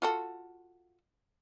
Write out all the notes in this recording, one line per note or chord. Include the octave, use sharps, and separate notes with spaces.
F4 F#4 A4